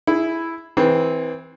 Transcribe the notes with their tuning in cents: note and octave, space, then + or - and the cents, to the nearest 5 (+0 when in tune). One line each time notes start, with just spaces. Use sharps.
E4 +0 G#4 +0
E3 -20 C4 -5 G#4 +0